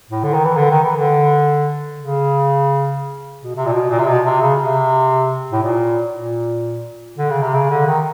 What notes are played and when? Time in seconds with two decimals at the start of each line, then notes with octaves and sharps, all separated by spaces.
0.10 A2
0.24 D3
0.34 D#3
0.45 E3
0.57 D3
0.70 D#3
0.83 E3
0.96 D3
2.00 C#3
3.44 B2
3.55 C3
3.66 A#2
3.73 B2
3.90 A#2
3.99 C3
4.07 B2
4.25 C3
4.41 C#3
4.59 C3
5.52 A2
5.63 A#2
6.15 A#2
7.18 D3
7.30 C#3
7.42 C3
7.54 C#3
7.70 D3
7.87 D#3